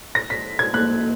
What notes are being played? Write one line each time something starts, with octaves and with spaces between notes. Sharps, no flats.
A#6
B6
G#6
A#3 F#6